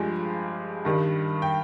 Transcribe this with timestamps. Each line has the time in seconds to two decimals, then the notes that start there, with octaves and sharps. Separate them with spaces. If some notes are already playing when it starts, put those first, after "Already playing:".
Already playing: G2 F3 G#3 G4 G#4
0.85 G2 D#3 G3
1.42 G5